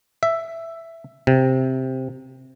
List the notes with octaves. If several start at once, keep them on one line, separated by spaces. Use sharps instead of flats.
E5
C3